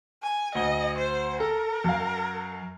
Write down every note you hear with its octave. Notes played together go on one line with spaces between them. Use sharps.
G#5
D2 D#5 G7
C5
A4 A#4
F#2 F5